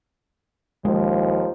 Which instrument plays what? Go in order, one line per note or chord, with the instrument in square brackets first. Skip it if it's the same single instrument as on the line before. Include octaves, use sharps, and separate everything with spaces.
[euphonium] D#2 [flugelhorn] F3 [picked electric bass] G#3